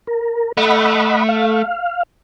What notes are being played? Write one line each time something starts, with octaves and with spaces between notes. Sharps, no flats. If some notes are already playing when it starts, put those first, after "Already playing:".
A#4
A3 D#5 F#5 B5
F5